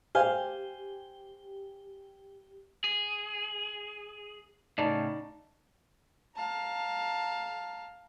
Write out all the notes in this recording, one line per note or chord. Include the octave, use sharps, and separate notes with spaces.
G4 C5 F5 G#5
G#4
A2 C#3 D#4 D5 A5
F5 A5 A#5